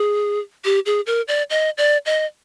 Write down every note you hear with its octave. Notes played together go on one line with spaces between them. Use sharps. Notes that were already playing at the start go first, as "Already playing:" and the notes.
Already playing: G#4
G4
G#4
A#4
D5
D#5
D5
D#5